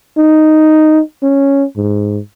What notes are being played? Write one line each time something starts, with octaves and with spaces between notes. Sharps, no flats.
D#4
C#4
G#2